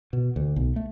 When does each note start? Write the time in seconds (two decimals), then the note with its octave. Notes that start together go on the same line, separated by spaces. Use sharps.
0.13 B2
0.36 D2
0.56 B1
0.76 A3